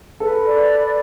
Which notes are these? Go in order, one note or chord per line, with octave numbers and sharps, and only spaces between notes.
A4 B4
D5
B4